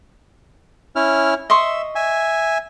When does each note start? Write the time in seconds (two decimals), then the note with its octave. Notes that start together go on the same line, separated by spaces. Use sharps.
0.96 C#4 E4 F6
1.50 D#5 E5 C6 C#6
1.95 E5 G#5